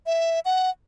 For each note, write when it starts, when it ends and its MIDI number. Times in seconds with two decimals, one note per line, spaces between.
0.06 0.40 76
0.45 0.70 78